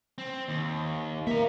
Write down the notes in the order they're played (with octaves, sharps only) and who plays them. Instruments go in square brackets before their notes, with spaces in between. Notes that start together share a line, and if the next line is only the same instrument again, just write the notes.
[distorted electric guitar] C4
D#2
[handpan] A#3 [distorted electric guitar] E5 A#5